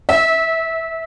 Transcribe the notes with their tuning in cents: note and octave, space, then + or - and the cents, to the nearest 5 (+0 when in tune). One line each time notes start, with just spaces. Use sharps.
E5 -25